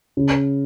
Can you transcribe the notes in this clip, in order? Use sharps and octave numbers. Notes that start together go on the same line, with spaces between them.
C#3